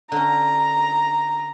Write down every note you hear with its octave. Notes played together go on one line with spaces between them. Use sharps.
D3 C#4 A#5